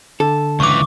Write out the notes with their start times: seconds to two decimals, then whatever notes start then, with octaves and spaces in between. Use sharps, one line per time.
0.20 D3 A4
0.60 C#2 E3 C#6 D6